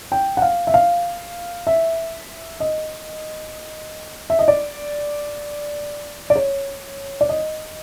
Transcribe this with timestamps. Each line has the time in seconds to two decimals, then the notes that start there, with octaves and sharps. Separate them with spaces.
0.12 G5
0.37 F#5
0.42 F5
0.67 E5
0.74 F5
1.67 E5
2.60 D#5
4.30 E5
4.39 D#5
4.48 D5
6.30 D5
6.36 C#5
7.21 D5
7.29 D#5